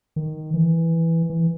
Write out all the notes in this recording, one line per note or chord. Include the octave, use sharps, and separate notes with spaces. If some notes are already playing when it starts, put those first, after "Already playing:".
D#3
E3
E3